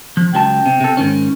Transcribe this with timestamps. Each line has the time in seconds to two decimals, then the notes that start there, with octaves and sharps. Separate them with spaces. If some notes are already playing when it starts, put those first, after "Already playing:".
0.17 F3
0.34 C#2 F#3 G5 A5
0.66 C3
0.81 C3 A4
0.97 G#2 D#3 C#4